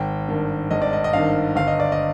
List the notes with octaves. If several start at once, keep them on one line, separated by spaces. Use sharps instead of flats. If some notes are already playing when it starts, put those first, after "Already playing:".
Already playing: G#1 G5
G2 D#3
G#1 D#5
D5
D#5
D#5
G2 D#3 F5
G1 F5
D#5
D5
D#5